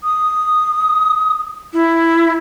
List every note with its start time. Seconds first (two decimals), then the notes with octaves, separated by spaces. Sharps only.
0.03 D#6
1.73 E4